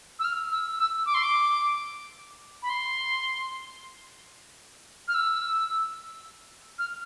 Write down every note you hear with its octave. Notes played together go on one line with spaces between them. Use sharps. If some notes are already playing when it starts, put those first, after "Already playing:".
E6
F6
E6
E6
D6
C6
D6
B5
C6
F6
E6
F6